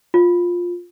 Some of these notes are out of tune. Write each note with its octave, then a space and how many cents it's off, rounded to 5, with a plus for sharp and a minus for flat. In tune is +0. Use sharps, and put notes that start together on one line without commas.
F4 +10